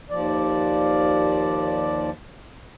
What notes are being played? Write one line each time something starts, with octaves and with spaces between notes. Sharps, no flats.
D#2 F3 D5